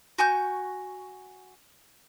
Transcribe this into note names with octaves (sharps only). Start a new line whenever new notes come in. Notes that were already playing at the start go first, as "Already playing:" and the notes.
F#4 G#5 C#6 G6